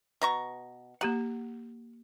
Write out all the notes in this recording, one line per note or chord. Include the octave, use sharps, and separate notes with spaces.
B2 A#5 C#6
A#3 G4 F#5 A#5